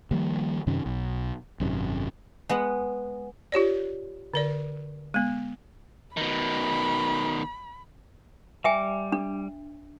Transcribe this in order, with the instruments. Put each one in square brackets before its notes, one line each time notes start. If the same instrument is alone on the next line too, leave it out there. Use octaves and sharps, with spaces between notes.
[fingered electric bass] D#3 F3 G3 A#3
F#2 C3 D#3 C#4
B1
G#1 F#2 C3
[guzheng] G#3 B3 F#5
[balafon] F4 G4 C#5 D5
D3 A#4 D5
G#3 B3
[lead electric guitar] B2 D#3 [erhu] B5
[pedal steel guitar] G3 D6 [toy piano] E5 G5 G#5
[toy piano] D4